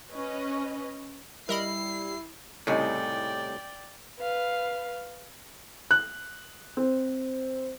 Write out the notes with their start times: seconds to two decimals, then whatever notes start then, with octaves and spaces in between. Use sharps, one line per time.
0.12 C#4 B4 D#5
1.49 G3 E4 A#4 D#5 B5 C7
2.67 C2 A2 C#3 D#4 D5 G5
4.19 B4 F5
5.91 F#6
6.77 C4